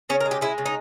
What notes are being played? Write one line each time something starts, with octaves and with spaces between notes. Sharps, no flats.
C#3 C#4
A#4
G#3
G4
G#3 E4
C#3
D#4